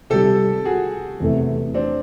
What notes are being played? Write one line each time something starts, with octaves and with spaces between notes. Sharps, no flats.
C3 D#3 G3 G4 A4
F#4 G#4
E2 C3 E3 A3
C4 D4